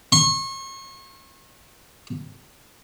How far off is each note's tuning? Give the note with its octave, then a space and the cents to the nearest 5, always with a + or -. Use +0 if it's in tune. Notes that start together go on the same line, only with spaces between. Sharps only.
C#6 -40